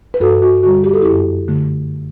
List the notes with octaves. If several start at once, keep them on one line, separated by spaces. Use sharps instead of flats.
B4
G2 F#4 A4
F#4
D3 G3 F#4
G4
A4
F#2 E4 G4
D3 A3